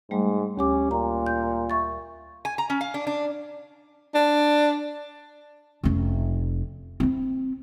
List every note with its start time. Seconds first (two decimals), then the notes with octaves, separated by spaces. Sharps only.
0.11 G#2 G3 A3
0.58 D2 C#4 G4 D6
0.91 A#2 A#5
1.26 G6
1.70 E5 C#6 A6
2.45 G#5
2.58 A#5
2.70 C#4
2.81 F5
2.94 D4
3.07 D4
4.15 D4
5.84 F1 C#4
7.00 C4 E4